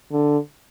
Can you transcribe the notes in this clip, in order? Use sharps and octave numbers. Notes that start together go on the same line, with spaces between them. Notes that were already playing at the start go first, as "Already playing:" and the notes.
D3